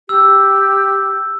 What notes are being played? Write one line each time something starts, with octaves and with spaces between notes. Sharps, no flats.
G4 E6